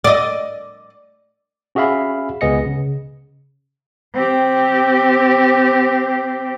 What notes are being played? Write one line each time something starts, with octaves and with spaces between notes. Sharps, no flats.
D5 D#5
C#4 F#4 G#4 E5 F5 B5
C#2 B3 G#4 D#5 A#6 C#7
C#3
C4 G4